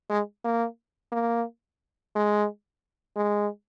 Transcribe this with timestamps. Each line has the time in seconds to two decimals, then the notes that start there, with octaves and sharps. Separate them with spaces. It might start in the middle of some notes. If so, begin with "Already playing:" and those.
0.10 G#3
0.44 A#3
1.12 A#3
2.15 G#3
3.16 G#3